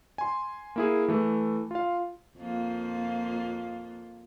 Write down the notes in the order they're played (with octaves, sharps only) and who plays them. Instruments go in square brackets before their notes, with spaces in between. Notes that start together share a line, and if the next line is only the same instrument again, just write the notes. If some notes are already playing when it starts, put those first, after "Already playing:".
[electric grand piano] G#5 C6
A#3 E4 G#4
E3 A3
F4 F5
[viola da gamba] F2 A#3 F4